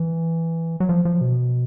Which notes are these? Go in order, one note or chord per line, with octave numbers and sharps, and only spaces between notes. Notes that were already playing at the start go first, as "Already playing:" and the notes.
Already playing: E3
F#3
F3
F3
B2